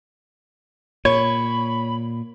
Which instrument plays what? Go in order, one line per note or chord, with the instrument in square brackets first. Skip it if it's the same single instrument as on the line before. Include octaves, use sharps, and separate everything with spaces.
[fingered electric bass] A#2 [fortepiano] C#5 [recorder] B5